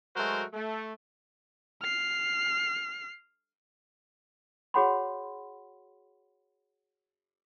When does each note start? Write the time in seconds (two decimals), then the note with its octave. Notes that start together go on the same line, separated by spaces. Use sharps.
0.16 F#3 G#3 A3 F#4 A#4 C5
0.53 A3
1.82 F6 C7
4.74 F#4 G#4 C#5 F#5 B5 C6